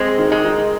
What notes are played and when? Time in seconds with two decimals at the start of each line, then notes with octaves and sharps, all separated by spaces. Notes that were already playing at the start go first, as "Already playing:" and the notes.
Already playing: G#3 C4
0.18 D#3
0.32 G#3
0.45 D#4